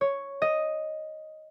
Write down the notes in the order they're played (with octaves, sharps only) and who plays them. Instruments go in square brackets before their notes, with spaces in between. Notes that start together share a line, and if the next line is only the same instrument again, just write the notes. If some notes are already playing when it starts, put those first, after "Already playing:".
[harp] C#5
D#5